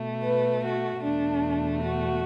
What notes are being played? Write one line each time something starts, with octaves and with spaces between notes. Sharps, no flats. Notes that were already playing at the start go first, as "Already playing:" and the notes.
Already playing: B2 A3
B4
F#4
E2 B2 A3 D4
F#4